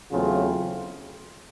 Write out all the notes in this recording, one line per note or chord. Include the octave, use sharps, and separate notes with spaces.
E2 C#3 F#3 A3 C4 F4